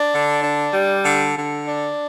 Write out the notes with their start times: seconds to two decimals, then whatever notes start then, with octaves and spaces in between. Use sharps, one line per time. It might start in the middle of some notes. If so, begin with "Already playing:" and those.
Already playing: D4
0.12 D3
0.42 D4
0.74 G3
1.04 D3
1.36 D3
1.66 D4